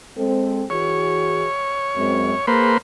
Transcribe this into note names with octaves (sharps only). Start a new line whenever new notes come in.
G#3 C4 A4
E3 F#4 G#4 C#5
F#2 G#3 C4
A#3 G#4 B4 C5